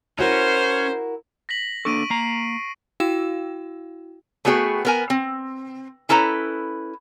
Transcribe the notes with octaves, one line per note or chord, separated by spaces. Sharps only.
C#4 E4 F#4 A#4 C5
A#6 B6 F#7
A#3 D4 A4 C#6 D7 D#7
A#3 A#5 C7
E4 F#4 F5 G5 E6 E7
A3 B3 F#4 G#4 C#5 G5
B3 A#4 G#5
C4
C#4 E4 A4 B4 A#5